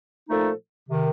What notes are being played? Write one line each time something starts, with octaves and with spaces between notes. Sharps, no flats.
A#2 F3 A3 D#4 A4
C3 D#3